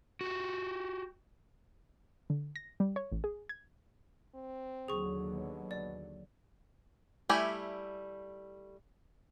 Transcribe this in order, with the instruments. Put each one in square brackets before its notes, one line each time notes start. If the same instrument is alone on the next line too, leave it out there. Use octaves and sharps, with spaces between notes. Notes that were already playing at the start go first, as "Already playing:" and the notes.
[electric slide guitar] F#4 G4
[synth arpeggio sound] D3
A#6
G3
C#5
A1
G#4
G#6
[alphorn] C4
[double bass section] D#2 D3 F#3 [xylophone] G#4 C#6
[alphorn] B2
[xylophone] D5
[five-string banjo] G3 A3 E4 G4 G#5